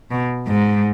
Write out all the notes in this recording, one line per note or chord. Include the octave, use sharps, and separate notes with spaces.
B2
G#2